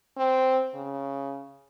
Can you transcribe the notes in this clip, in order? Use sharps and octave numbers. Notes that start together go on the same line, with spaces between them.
C4
C#3